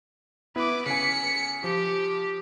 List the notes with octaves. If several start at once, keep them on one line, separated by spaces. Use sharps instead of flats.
B3 E4 B4 D6
C#3 G#5 B6 C#7
F3 G4